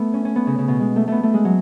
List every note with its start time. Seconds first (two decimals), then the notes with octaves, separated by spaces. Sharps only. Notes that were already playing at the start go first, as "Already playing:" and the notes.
Already playing: A3 B3
0.14 C#4
0.25 C#4
0.36 B3
0.47 C#3
0.58 C#3
0.68 B2
0.80 G#3
0.96 A3
1.08 A3 B3
1.23 A3
1.34 G#3
1.45 F#3